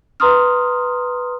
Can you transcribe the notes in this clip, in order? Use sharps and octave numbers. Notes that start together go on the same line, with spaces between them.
B4 A#5 C6 D#6 F6